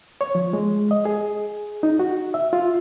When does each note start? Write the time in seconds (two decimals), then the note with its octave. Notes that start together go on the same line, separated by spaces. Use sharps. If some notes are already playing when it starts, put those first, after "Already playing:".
0.21 C#5
0.35 F3
0.53 G#3
0.91 D#5
1.05 G#4
1.83 D#4
1.99 F#4
2.34 E5
2.53 F4